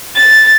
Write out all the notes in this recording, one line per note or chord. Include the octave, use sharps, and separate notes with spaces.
A6